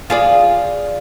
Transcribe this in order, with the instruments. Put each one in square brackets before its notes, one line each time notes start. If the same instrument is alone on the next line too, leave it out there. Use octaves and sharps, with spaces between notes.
[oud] F4 G#4 D5